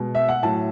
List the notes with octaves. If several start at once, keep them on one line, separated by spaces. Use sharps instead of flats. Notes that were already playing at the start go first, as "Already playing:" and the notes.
Already playing: B2 G#3
E5
F#5
A2 F#3 A5